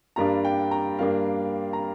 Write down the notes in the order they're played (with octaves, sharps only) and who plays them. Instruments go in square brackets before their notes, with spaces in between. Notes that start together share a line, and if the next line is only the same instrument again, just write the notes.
[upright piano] G2 G3 A#3 D4 A#5
G5
A#5
G2 G3 A#3 D4 F5
A#5